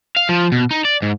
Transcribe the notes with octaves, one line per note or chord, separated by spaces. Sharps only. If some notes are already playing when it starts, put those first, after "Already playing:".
F5
F3
B2
D#4
D5
G#2